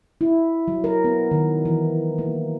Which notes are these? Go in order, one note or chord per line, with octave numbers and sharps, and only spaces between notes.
E4
F#3
A#4
B3
D#3
E3
A#3